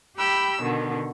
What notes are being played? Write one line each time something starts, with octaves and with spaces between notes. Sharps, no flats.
G4 G5 B5 E6
B2 D3 D#3